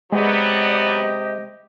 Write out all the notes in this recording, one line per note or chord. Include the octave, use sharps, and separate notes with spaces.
C3 F#3 G#3 B3 G4 D5 D#5